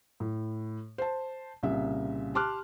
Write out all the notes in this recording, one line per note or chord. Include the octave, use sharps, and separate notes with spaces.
A2
C5 A5
C2 A#2 C#3 E5
G4 A5 C6 D6 F6 F#6